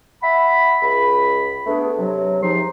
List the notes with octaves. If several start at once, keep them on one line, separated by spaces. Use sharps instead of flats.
E5 F#5 B5
C#2 B5
A3 B3 D4 G#4
C3 F#3
C#2 C3 F3 D#4 C6